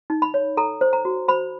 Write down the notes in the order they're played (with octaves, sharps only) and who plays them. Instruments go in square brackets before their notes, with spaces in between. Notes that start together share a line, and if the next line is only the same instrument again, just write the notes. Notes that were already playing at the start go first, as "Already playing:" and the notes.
[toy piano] D#4
B5
C#5
A4 A#5
C5
A#5
F#4
C5 B5